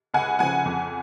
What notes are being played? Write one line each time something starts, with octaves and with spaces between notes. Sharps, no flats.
C#2 F#5 G#5
C#3 F3 F#5 G#5
F2